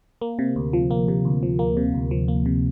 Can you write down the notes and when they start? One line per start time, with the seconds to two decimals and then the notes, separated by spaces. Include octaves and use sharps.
0.21 A#3
0.39 C3
0.56 D2
0.73 F3
0.91 A#3
1.08 C3
1.25 D2
1.43 F3
1.59 A#3
1.77 C3
1.94 D2
2.11 F3
2.28 A#3
2.46 C3